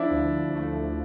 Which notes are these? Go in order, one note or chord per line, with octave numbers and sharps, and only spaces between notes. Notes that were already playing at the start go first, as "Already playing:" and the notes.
Already playing: F3 D4 E4
D2
A3